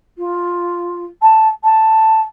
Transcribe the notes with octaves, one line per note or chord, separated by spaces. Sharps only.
F4
A5
A5